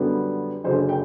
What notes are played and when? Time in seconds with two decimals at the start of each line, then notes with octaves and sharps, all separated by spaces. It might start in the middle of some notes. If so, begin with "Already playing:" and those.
Already playing: F#2 D3 G3 B3
0.64 F#1 F#2 D3 C5
0.89 G5